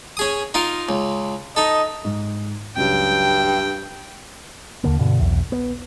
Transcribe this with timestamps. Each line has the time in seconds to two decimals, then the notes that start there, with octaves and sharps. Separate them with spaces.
0.17 C#4 G#4 D#6
0.54 D#4 F4 A#4
0.89 C#2
1.57 D#4 A4 D#5
2.04 G#2
2.76 C#2 G2 F#3 G5
4.84 D#2 D3 A#3
4.99 G2 B2 D3
5.20 B1 E2
5.52 B3